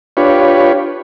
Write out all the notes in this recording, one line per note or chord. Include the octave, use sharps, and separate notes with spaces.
D4 F4 G4 B4 C#5